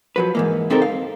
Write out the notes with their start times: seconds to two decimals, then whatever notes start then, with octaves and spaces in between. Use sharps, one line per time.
0.16 F3 F#3 B4
0.35 G#2 E3 A#3
0.70 C#3 C4 D#4 G4 A4 A#4
0.82 F5